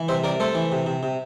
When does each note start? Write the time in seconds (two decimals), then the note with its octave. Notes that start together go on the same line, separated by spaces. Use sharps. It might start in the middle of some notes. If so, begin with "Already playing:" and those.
Already playing: E3
0.08 C3 C5 E5
0.24 C3 A#4 D5
0.40 A3 A4 C5
0.55 E3
0.72 C3
0.86 C3
1.03 C3